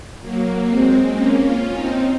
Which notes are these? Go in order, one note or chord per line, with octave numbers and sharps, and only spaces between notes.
F#3 A#3
G#3 C4
A#3 C#4
C#4 F4
C4 D#4